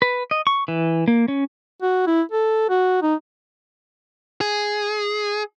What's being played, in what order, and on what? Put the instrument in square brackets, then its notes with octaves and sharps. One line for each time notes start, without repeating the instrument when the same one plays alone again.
[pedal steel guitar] B4
D#5
C#6
E3
A#3
C#4
[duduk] F#4
E4
A4
F#4
D#4
[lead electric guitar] G#4